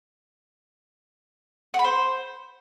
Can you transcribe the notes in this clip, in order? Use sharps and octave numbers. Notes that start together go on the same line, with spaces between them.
F#5
B5
C5